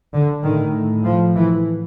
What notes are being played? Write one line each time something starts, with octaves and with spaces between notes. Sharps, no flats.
D3
A2 D#3
F3
E3